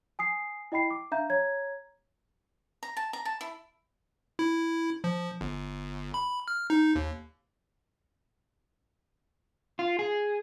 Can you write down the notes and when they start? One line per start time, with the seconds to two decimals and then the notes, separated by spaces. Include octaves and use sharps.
0.19 G#5 D#6 C7
0.72 E4 D#5 G5 B5 C7
0.90 D6
1.12 D4 E5 F5 A#5 G6
1.30 C#5 A#5 G#6
2.83 A#5
2.97 A5
3.13 A#5
3.25 A5
3.41 E4
4.39 E4
5.04 F3
5.41 G1
6.14 B5
6.48 F6
6.70 D#4
6.96 D#2
9.79 F4
9.99 G#4